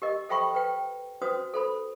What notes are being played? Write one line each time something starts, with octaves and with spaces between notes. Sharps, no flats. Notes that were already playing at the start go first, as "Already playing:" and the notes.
G4 A#4 D#5
A4 C5 E5 G5 B5 C#6
B4 G5
C#4 F#4 B4 C5 D#6
A4 C5 B5